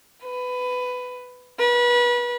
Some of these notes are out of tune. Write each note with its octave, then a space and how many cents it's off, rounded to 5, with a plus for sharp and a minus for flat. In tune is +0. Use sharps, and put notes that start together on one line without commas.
B4 +15
B4 -30